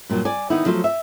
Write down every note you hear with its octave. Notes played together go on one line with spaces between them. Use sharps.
G2 A#2 D3 F#3
D5 G#5
D#3 B3 D#4 E4
F3 F#3 A3 C5
E5